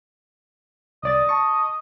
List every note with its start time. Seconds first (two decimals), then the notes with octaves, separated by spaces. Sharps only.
1.03 C2 D5 D#5 A6
1.29 A5 C#6